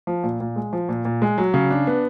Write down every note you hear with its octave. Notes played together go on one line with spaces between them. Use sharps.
F3
A#2
A#2
G#3
F3
A#2
A#2
G#3
F#3
C#3
D4
B3